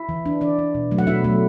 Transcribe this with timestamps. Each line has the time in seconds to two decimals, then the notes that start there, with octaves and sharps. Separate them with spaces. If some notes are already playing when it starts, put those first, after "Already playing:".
Already playing: E4 E5
0.09 E3
0.26 D4
0.41 E3 D4 D5
0.59 D4
0.75 B2
0.91 F#3 A3
0.98 F#5
1.07 B2 E4 E5
1.24 F#3 A3